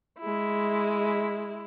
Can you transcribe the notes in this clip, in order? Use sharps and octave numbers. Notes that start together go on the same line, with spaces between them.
G#3 E4